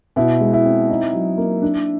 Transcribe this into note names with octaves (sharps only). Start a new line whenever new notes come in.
B2 E4
G#3
E4
C4
D#4
F#3
A#3
D4